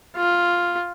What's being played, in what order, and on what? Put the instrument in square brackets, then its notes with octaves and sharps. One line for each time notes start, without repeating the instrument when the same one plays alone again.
[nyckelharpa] F4